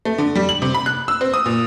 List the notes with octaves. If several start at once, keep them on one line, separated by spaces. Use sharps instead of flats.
A3
D3
G3
F#7
C3
B5
F#6
E6
C4
D#6
A#2